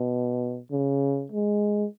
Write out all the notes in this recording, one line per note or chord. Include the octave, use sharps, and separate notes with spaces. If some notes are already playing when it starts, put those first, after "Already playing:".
Already playing: B2
C#3
G#3